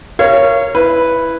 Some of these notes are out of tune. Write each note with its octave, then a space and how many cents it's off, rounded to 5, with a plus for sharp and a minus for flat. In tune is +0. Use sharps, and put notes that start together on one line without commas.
A#4 +0 C#5 +0 F5 -35
E4 +0 B4 +0